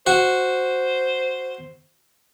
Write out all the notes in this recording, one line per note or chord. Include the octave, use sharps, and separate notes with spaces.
F#4 C5